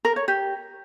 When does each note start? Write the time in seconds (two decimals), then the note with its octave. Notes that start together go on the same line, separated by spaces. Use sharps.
0.05 A#4
0.16 C#5
0.28 G4